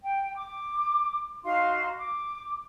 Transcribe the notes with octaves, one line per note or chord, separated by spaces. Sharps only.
G5
D6
D#4 F#4 F5 C6
D6